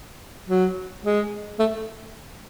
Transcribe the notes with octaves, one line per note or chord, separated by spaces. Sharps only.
F#3
G#3
A3